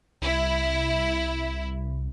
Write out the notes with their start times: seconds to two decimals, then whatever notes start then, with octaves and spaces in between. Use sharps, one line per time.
0.22 C2 E4